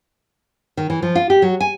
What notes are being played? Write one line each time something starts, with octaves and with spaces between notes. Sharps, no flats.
D#3
E3
F3
F4
G4
F#3
G#5